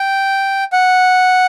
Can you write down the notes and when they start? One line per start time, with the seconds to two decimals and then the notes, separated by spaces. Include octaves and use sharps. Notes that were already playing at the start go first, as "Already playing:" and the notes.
Already playing: G5
0.73 F#5